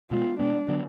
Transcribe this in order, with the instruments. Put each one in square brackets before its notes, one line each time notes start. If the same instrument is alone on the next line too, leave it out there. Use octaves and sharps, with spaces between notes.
[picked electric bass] B2 G#3 B3 [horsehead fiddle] F4
[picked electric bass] B2 G#3 B3 [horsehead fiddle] D4
[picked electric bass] D3 F#3 B3